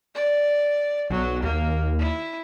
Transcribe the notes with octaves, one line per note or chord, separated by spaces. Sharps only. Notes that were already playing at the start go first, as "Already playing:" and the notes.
D5
B1 F#3
D#2 A#3
E4